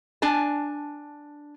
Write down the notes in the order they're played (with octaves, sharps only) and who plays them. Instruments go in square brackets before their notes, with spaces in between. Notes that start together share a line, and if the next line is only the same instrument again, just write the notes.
[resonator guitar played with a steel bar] D4 G#5 A5